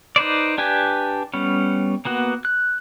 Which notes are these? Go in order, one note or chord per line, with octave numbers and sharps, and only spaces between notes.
D#4 B4 C5 D5
D4 G4 B4 G#5
G3 B3 C#4
A#3 B3 F#4
F#6